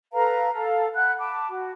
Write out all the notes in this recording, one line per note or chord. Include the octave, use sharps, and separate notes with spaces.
A4 B4 F5 A#5
A4 F5
F#5 B5 F#6
A5 B5 D6
F#4